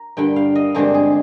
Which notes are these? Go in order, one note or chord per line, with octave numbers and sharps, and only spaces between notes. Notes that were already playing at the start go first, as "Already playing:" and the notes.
Already playing: A#5
G2 D3 G3 G5
F5
D#5
G2 D3 G#3 C4 G4
G#4